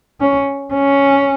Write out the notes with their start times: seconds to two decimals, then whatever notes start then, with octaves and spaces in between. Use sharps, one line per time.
0.21 C#4
0.73 C#4